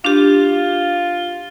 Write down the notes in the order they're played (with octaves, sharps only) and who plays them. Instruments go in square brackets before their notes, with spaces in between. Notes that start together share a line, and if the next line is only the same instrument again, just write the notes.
[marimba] D4 G4 [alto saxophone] F4